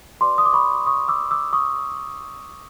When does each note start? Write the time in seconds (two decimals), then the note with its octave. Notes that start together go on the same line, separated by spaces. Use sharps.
0.21 F#4 B4 D5 C6 D6
0.38 D#6
0.46 D6
0.53 B5 C#6
0.86 C#6 D#6
1.08 D6 E6
1.31 D6 E6
1.53 C#6 D#6